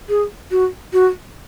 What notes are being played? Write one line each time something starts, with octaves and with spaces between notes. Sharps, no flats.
G#4
F#4
F#4